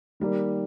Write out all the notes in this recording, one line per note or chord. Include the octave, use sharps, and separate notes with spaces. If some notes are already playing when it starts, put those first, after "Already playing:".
D#3 G3 A#3